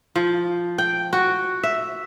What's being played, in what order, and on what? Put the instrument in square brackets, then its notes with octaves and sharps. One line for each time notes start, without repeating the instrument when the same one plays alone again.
[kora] F3
G5
F#4
E5